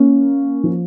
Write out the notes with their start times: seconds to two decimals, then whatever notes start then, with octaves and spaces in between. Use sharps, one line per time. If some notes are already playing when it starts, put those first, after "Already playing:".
Already playing: A#3 C#4
0.64 F3